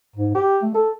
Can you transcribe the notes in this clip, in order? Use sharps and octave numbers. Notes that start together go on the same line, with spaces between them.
G#2
G4
A3
A4